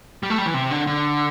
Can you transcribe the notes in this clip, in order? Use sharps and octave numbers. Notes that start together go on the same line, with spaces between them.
G3
A3
G3
E3
C3
D3
D3